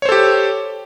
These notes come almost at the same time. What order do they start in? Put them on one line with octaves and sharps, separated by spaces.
C#5 C5 A4 G4